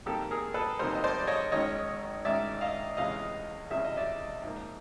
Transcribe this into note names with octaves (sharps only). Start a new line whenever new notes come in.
F2 C3 D#3 G3 A#3 G4 A4
G#4 A#4
A4 B4
F2 C3 D#3 G3 A#3 A#4 C5
D#5
C5 D5
D5
C#5 D#5
G#1 G#2 D#3 G#3 C#4 C#5 D#5
G#1 G#2 D#3 G#3 C#4 D5 E5
D#5 F5
C#2 C3 E3 G#3 C#4 D#5 F5
C#2 C3 E3 G#3 C#4 E5
D#5
D5 E5
G#2 F3 A#3